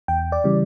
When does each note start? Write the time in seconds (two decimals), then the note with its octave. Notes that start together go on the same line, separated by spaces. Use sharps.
0.08 E2 G5
0.32 D5
0.44 C#3 E3 G3